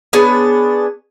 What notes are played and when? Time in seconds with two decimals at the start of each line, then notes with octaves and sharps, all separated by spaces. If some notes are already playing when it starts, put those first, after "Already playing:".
0.13 B3 D4 G#4 C#5